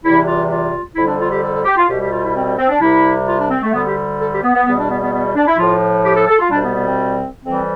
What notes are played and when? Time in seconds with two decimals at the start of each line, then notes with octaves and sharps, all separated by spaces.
0.03 E2 C3 E3 G3 E4
0.26 F4
0.49 F4
0.96 F2 D3 G3 E4
1.07 D4
1.19 F4
1.30 G4
1.42 A4
1.53 A4
1.65 G4
1.77 F4
1.87 C2 B2 G3 G4
2.00 G4
2.11 F4
2.23 E4
2.34 C4
2.46 C4
2.58 C4
2.69 D4
2.80 C2 C3 G3 E4
3.27 F4
3.38 D4
3.50 C4
3.62 A3
3.73 D2 D3 G3 B3
3.84 G4
4.19 A4
4.31 G4
4.43 B3
4.54 B3
4.65 E2 B2 G3 B3
4.77 D4
4.88 B3
5.01 B3
5.12 B3
5.35 D4
5.47 E4
5.58 A2 F3 F4
6.04 G4
6.16 A4
6.28 A4
6.39 F4
6.50 C2 B2 G3 D4
6.62 B3
6.74 B3
6.86 C4
7.43 F2 E3 G3 C4